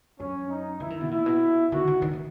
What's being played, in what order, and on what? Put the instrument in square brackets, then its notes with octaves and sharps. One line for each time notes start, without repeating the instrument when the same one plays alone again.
[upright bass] F#2 [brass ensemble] C#4
[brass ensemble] D#4
[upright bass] E3 [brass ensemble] E4
[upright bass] D#3
B2
[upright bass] A#2 [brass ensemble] E4
[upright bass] B2
[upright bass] D#3 [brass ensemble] F#4
[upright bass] D#3
D#3
E3